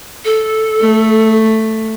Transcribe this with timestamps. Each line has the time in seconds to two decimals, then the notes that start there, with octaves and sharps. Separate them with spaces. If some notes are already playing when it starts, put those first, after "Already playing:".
0.25 A4
0.81 A3